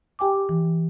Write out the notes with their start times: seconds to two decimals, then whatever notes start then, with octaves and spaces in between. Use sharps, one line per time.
0.19 G4 G5 G#5 D6
0.49 E3